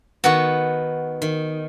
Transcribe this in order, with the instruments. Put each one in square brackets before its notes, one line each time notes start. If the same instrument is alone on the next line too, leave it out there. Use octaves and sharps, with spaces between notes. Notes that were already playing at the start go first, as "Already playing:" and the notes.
[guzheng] D#3 B3 [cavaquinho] F#4 F#5 C#6
[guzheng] D#3